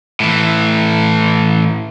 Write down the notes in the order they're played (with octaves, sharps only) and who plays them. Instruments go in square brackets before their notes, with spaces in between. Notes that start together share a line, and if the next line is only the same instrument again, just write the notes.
[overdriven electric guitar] A2 E3